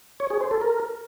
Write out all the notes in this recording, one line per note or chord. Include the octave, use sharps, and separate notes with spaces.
C#5
G#4
C5
A4
A#4